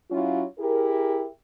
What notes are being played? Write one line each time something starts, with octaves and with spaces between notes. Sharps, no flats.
F#3 C#4 E4 F4
E4 G4 G#4 A#4